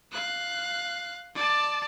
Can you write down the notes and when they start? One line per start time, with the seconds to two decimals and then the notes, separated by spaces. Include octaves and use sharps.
0.12 F5 F#6
1.35 D5 A5